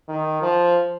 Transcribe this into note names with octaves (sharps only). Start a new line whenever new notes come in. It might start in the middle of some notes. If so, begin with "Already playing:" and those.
D#3
F3